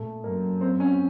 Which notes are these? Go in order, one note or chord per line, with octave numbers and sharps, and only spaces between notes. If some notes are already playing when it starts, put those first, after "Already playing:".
Already playing: A#2 A3
F#2 A#3
C4
C#4